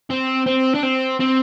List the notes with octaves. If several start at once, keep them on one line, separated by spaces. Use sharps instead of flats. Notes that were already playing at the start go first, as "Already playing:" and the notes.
C4
C4
D4
C4
C4